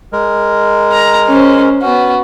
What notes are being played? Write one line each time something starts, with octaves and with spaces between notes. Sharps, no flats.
G#3 A#4
A#5
C#4 C5
B3 C#4 F#4